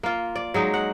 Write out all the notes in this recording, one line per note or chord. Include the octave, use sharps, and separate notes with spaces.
A#3 F4
D5
F#3 G#3 D#4
F#5